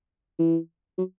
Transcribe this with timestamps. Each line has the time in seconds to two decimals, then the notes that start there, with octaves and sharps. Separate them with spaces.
0.39 E3
0.98 F#3